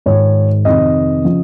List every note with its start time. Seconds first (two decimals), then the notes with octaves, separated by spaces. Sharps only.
0.06 G#2 D#3 C#5
0.65 F2 C3 D#3 D#5
1.24 C#3 F3